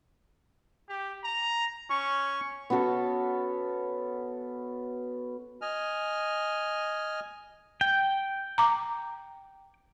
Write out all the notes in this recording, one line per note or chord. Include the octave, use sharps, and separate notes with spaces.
G4
A#5
C#4 C#6
B3 C#4 F#4 A4
D#5 G#5 F6
G5
A#5 D6